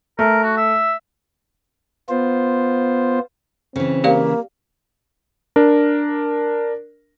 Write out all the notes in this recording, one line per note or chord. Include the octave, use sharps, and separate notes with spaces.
A3 A#4
F#4
E5
B3 F4 C5
C#3 E3 C4
A#3 G4 D5 F5
D4 A#4